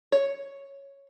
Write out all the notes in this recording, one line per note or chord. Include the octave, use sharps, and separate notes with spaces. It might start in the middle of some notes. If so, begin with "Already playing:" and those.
C#5